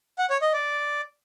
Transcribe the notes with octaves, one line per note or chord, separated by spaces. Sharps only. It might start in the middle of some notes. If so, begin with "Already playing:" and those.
F#5
C#5
D#5
D5